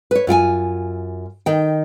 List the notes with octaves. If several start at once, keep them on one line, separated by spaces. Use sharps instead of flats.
B4 C#5
F#2 F4 G5 G#5
D#3 G5